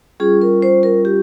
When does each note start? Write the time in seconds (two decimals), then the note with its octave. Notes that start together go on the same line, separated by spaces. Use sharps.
0.20 G3 C#4 F4 G#4
0.42 A#4
0.62 C5
0.83 A#4
1.05 G4